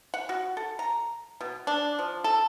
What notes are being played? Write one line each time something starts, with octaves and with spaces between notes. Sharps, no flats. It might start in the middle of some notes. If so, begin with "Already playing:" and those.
F#5
F#4
A4
A#5
B2
D4
F3
A4